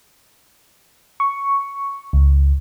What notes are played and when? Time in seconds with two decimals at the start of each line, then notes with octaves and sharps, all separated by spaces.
1.20 C#6
2.13 C#2